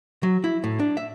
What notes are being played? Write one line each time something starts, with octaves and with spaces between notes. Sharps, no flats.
F#3
E4
A2
D4
E5